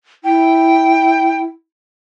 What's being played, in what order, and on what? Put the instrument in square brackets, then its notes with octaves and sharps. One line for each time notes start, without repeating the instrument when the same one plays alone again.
[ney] E4 [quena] G5